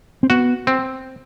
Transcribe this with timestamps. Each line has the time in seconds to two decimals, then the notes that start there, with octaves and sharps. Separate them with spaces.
0.23 C4
0.30 B3 F#4
0.67 C4